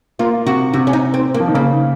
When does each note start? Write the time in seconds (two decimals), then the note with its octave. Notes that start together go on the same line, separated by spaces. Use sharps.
0.19 A#3 F4
0.46 C3 F#4
0.74 C3 F#4
0.87 C#4
0.93 D#4
1.14 C4
1.34 A#3
1.40 F3
1.48 D#3
1.54 C#3 A#3